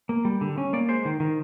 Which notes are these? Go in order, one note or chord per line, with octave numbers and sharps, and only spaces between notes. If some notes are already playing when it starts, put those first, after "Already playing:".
A#3
G3
D3
C#4
A#3 D5
G#3 C5
D#3
D#3